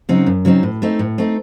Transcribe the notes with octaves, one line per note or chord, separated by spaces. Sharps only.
C#3 F#3 C4 D#4
F#2
C#3 F#3 C4 D#4
A2
A3 C4 D#4
A2
A3 C4 D#4